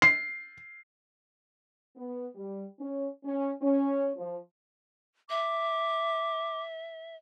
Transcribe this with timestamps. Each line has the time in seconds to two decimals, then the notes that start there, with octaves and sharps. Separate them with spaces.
0.02 C7
1.96 B3
2.35 G3
2.79 C#4
3.25 C#4
3.62 C#4
4.17 F3
5.30 E5 D6